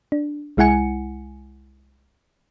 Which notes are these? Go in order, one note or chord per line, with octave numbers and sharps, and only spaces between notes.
D4
C2 G#3 E4 F#5 G#5 C#7